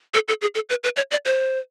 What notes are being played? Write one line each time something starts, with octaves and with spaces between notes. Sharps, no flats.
A4
A4
G#4
A4
B4
B4
C#5
D5
C5